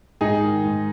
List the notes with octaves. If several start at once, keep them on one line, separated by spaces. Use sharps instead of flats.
G#2 D#4 G#4
D#3
G#2